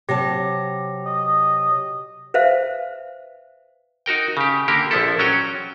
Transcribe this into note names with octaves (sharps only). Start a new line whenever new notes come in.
C3 F#3 G4 A5 A#6
D#5
B4 C5 E5 F5
D#4 F#4 A#4 G5
C#3 G4
D3 A#3 G4 A#4
A#1 F3 E4 A4
F#3 C#4 F#4 C#5 G5